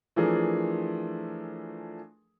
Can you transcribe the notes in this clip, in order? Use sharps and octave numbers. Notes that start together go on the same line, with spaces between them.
E3 F3 A3 D4 G#4 A#4